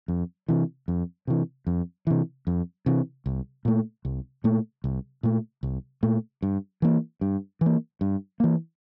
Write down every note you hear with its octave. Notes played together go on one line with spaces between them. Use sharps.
F2
C3 E3
F2
C3 E3
F2
C3 E3
F2
C3 E3
C2
A#2 A3
C2
A#2 A3
C2
A#2 A3
C2
A#2 A3
G2
E3 A#3
G2
E3 A#3
G2
E3 A#3